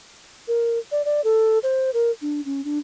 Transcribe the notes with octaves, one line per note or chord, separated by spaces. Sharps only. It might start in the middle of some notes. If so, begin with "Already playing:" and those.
A#4
D5
D5
A4
C5
A#4
D4
C#4
D4